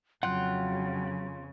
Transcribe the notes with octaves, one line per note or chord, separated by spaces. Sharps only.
F2 C#3 F#3 F4 F#5 G5 F#6